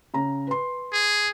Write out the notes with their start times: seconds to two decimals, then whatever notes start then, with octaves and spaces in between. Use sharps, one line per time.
0.14 C#3 A#5
0.47 B4 C6
0.93 G#4